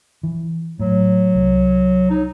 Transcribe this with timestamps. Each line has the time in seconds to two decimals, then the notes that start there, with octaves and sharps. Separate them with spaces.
0.23 E3
0.79 A2 F#3
1.35 C2
2.11 D#4